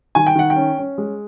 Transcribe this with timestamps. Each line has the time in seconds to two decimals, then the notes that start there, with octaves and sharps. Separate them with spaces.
0.15 D#3 G#5
0.27 G5
0.35 D#3 F#5
0.50 G5
0.56 C#4
0.78 C#4
0.98 G#3